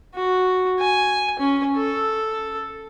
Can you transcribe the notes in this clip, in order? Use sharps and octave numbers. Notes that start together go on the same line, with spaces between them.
F#4
G#5
C#4
A4